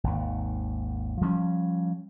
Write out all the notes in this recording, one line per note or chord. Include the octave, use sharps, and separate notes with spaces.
G#1 D#2
F3 G3 A3 C#4